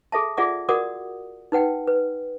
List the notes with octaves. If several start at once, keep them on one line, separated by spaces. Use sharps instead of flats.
G#4 A4 E5 A5
F4 G#4 D5 E5 F#5 D6
F#4 A#4 D5 F#5 D6 D#6
D#4 B4 F#5 G5
B4